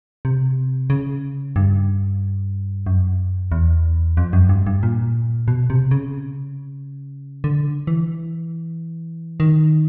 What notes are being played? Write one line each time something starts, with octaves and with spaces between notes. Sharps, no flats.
C3
C#3
G2
F#2
E2
F2
F#2
G2
G2
A#2
B2
C3
C#3
D3
E3
D#3